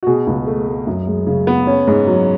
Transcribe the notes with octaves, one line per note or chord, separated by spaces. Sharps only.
F#4
B2 G#4
C#2
A3
A3
F#2
G#3
C#3
B3
C#4
G#2
F#3